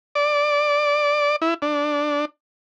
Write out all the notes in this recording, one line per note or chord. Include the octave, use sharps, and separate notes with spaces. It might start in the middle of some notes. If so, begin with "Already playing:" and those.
D5
E4
D4